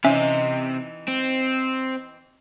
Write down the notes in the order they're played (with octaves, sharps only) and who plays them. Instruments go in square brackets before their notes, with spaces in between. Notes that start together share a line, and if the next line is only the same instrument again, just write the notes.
[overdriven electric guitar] C3 [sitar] E3 D#4 [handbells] C#4 E5
[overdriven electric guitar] C4